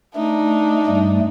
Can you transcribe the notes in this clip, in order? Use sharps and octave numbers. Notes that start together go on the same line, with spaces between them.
A3 D4 D#4
G2 G3 A3